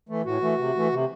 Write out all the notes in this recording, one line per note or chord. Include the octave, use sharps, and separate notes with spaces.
E3 A3
A2 F#4
E3 A3
C3
E3 A3
C3